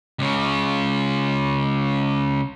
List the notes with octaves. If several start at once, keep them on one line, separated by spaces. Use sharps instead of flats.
C#2 C#3